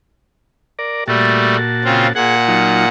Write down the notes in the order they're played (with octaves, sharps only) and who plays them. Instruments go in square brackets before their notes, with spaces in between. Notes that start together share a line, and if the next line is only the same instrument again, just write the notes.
[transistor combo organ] A#4 D5
[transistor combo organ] A#2 F#4 A5 [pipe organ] G3 A3
[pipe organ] C#3 C4 F4
[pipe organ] A#2 F#5 [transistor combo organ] G#4
[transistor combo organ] F#3 D#4 F4